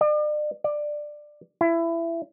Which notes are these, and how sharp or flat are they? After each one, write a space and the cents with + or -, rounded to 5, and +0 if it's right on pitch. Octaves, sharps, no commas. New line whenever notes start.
D5 +40
D5 +15
E4 +20